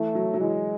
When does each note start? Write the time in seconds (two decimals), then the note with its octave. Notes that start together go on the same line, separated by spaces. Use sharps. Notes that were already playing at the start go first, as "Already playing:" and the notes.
Already playing: E3 A3
0.15 F#3
0.34 F#3
0.40 E3 G#3